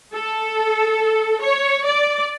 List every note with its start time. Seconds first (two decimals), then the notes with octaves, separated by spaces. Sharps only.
0.12 A4
1.41 C#5
1.86 D5